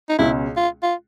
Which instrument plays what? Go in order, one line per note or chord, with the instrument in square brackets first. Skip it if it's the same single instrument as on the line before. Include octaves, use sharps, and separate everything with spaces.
[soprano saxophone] D#4
[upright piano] C#2 B2 G#3 C#4 [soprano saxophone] E4
[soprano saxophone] F4
F4